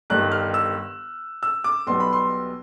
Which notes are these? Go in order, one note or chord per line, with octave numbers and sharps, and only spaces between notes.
G1 G2 D#3 G3 F#6
F6
E6
E6
D6
B1 B2 G3 B3 C6
B5
C6